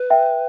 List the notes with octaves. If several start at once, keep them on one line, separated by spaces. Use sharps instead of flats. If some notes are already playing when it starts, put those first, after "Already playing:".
Already playing: B4
E5 G5